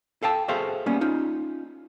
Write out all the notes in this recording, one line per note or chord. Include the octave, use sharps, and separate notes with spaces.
A4 F5 G5 A5
F#4 G#4 A4 C5 E5 F5
G3 A#3 B3 C#4
C#4 D#4 F4